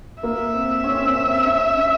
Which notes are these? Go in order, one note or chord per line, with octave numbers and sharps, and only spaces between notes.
A#3 E5
C4
C#4
C4
C#4
C4
C#4
C#4